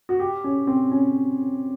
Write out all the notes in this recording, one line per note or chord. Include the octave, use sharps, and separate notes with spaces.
F#4
G4
C#4
C4
C#4